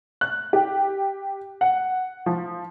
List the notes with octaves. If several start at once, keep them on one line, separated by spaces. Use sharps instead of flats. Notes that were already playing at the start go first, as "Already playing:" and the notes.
F#6
G4
F#5
F3